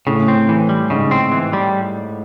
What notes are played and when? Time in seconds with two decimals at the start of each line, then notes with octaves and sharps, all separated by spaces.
0.07 A2 C#3
0.28 C4
0.49 E3
0.69 G3
0.90 G#2 C#3
1.11 C4
1.32 E3
1.53 G3